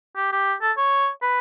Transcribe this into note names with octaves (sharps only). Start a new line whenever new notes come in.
G4
G4
A4
C#5
B4